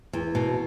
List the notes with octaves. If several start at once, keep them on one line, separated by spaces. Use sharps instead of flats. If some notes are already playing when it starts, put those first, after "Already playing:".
E2
B2